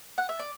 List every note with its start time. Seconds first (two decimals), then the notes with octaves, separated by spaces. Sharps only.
0.18 F#5
0.29 E5
0.39 D5